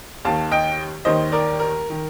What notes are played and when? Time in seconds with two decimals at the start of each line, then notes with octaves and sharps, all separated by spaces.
0.25 D#2 D#3 F5 A5
0.51 D#5 G5
1.05 D#2 D#3 C5 D#5
1.32 A#4 D5
1.60 A#4
1.90 D#3